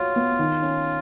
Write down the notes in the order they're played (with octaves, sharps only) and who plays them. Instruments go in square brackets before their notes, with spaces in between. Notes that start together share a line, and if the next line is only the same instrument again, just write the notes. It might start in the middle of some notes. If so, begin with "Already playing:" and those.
Already playing: [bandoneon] F4 [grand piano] F#4 C#5
[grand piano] B3
D#3
C#4